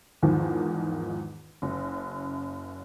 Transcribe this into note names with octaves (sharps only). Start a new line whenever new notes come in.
E2 G#2 D#3 F3
F#1 F#2